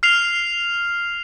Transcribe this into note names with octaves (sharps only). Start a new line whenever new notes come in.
F6 C7 F7